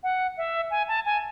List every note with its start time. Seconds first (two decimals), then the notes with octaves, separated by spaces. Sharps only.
0.03 F#5
0.37 E5
0.71 G#5
0.88 A5
1.05 G#5